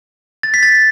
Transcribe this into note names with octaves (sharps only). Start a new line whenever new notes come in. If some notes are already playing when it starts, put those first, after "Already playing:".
A6
B6
A6